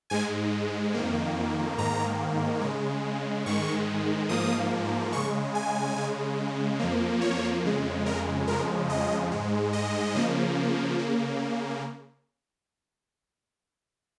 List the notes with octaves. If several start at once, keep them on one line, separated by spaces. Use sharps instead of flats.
G#2 G#3 G#5
F2 D#3 A#3
G#2 D#3 A#3 A#5
C#3 G#3
G#2 D#3 G#3 C#6
G#2 F3 A#3 D#6
C#3 G#3 C#6
G#5
C#3 G#3
F2 F3 A#3
C#5
F2 C#3 G#3
A#4
F2 C#3 F3 G#3 A#4
D#5
G#2 G#3
D#5
C#3 F3 A#3
C#3 A#3